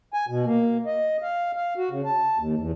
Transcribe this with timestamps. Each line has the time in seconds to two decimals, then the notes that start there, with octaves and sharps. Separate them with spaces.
0.14 G#5
0.28 B2
0.45 A#3
0.86 D#5
1.22 F5
1.56 F5
1.77 F#4
1.91 C#3
2.05 A5
2.38 D#2
2.58 E2